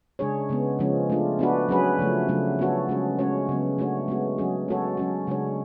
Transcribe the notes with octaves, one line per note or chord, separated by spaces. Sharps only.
C#3 G#3 D4 G#4 C#5
C#3 G#3 B3
C#3 F3 G#3 C#4
A3 D4 F4
B3 D4 F#4 B4
F#3 C#4 G#4 B4
C#3 F3 A3
C#3 F#3 A3 D4
B3 D4 F#4 A4 C#5
C#3 G#3 C#4 G#4
G#3 C#4 F#4 C#5
C#3 F#3 B3
A3 D4 F#4 C#5
G#3 B3 F#4
F#3 C#4 G#4
G#3 B3 F#4 A4 C#5
F#3 C#4 F#4
C#3 G#3 D4 F#4 C#5